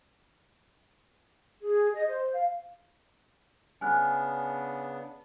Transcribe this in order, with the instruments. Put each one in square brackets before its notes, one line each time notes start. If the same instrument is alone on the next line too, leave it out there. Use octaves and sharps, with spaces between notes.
[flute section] G#4
D#5
C5
F5
[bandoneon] C#3 B3 D4 [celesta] G#5 F6 F#6